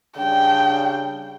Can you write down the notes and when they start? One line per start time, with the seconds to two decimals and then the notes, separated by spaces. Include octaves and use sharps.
0.18 C#3 G3 D4 G5